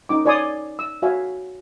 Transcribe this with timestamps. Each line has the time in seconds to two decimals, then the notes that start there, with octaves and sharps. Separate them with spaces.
0.09 C#4 D#4 D6
0.25 C#5 D5 G#5 C6 D#6
0.79 E6
1.02 F#4 C#5 E5 F5 G#5